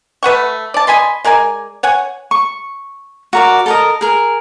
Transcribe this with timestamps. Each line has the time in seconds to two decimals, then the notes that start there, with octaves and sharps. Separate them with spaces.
0.23 A3 B4 F#5 C#6
0.74 D5 A5
0.87 D#5 G#5 B5 C6
1.24 G#3 A#4 D5 G#5
1.83 C#5 F#5 G#5
2.31 C#6
3.33 F#4 A#4 D5
3.66 A4 A#4 D#5
4.01 G#4 A#4